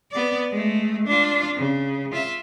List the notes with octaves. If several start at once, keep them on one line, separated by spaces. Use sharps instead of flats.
B3 D5
G#3 A3
D4 F4
C#3
F4 E5